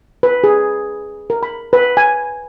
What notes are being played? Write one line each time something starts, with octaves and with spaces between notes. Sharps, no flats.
B4
G#4
A#4
B5
B4
G#5